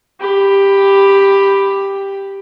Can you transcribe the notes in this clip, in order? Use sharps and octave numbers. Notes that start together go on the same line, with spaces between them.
G4 B5